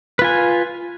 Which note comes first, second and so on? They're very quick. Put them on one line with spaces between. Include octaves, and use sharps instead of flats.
B4 F4 G#5